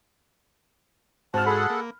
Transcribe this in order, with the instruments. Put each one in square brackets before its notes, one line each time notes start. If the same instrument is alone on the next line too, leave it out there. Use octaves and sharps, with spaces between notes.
[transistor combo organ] G#2 F#4 [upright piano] C4 F6 [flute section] A5
[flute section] G#4 [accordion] A4 F#5 [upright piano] B5
[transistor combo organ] A#3